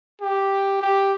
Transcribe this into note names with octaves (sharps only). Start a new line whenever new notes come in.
G4
G4